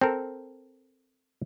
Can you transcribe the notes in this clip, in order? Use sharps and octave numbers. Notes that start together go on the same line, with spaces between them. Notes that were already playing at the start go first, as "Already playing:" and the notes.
C4 A4 A#4